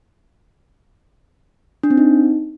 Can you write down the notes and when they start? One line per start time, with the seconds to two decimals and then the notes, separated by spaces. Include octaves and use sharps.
1.83 D4
1.90 C4
1.97 D#4